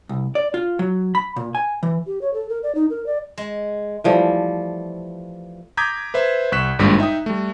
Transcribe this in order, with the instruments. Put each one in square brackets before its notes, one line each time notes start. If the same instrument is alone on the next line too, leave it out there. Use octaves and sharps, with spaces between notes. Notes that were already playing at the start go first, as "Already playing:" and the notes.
[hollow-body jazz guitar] C2
D5
F4
F#3
B5
A#2
G#5
E3
[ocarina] G4
C#5
A4
A#4
D5
D#4
A#4
D5
[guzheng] G#3
[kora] E3 F3 G3 A3
[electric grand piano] A#5 D6 D#6 G6 G#6 B6
B4 C5 E5
C2 C#6 F#6 B6 E7
G#1 G2 A#2 G3 G#3 B6
D#4 E5 G5 D#6
G3 A3